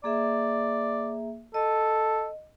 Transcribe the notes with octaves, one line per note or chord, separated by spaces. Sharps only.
A#3 G#4 D5 E5
A4 D#5